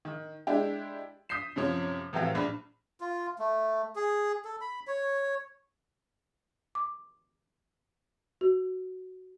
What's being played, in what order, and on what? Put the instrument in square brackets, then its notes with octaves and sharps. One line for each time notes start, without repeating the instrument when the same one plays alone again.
[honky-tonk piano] D#3
G#3 D4 E4 G4
D#6 G6 B6 C7 E7
F#2 C3 F3 C#5
A2 E3 F#3 C4 G4 F5
A#1 B5
[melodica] F4
A3
G#4
A4
B5
C#5
[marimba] D6
F#4